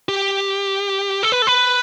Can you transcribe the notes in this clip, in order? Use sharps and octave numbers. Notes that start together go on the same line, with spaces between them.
G4
A4
B4
A4
B4